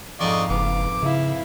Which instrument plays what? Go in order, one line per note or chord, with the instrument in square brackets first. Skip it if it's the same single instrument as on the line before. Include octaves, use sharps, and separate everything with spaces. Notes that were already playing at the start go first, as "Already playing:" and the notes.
[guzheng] F2 G#2 [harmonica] D5 D#5 C#6 [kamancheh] F5
[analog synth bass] F#1 [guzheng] B3 [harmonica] D6
[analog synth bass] C#3 [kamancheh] E4 F5